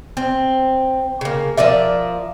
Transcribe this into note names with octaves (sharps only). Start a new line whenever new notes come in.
C4
C#3 A#3
F3 A#4 D5 E5